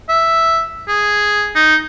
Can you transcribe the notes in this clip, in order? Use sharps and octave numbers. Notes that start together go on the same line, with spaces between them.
E5
G#4
D#4